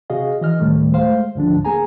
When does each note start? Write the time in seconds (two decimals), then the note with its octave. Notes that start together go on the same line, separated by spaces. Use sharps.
0.10 C3 F#4 G#4 D#5 F5
0.41 E3 D#5 F6
0.60 D2 A2 D#3 G3 A3
0.93 G#3 A3 C5 F5
1.36 D2 G#2 D3 F3 D4
1.65 A#3 G#4 G#5 A#5